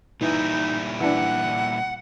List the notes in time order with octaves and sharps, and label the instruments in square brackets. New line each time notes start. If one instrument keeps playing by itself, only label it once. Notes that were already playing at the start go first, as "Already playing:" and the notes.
[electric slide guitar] A#2 G3 E4 [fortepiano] E3 [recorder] D#4
[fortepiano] E3 D4 [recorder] F#5